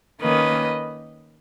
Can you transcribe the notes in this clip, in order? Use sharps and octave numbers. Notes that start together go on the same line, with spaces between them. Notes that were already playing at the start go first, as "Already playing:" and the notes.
D#3 A#3 C#4 B4 D#5